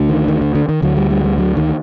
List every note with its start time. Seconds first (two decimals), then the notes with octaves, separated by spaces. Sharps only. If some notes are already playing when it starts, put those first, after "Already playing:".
Already playing: D2 D3
0.09 D#3
0.28 D#3
0.41 D3
0.55 D3
0.69 D#3
0.82 D2 D3 F#3
0.97 G3
1.11 G3
1.24 G3
1.38 F#3
1.57 D#3